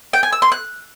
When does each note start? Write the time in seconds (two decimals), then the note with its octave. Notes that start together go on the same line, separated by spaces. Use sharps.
0.13 G5
0.23 G#5
0.33 E6
0.42 C6
0.52 F#6